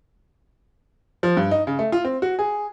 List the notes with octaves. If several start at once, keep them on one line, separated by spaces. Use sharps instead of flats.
F3
G2
D#4
C#3
A3
F4
C4
F#4
G#4